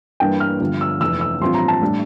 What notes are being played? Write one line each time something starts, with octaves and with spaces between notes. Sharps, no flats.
G2 E3 A#3 D4 G5
F6
G1 G2 D3 F3
E6
F1 F2 E3 E6
E6
A1 G2 F3 C4 C6
A#5
A5
A2 G3 D4